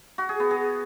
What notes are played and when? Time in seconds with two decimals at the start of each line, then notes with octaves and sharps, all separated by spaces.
0.18 F#4
0.29 G#4
0.40 B3
0.51 G#4